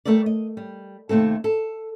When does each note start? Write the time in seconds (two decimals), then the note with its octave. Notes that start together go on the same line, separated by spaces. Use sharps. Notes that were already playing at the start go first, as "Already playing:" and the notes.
0.05 G3 A3 A4 A#4 D5
0.26 D#5
0.57 G3
1.09 D#2 C3 A3 C4 A4
1.44 A4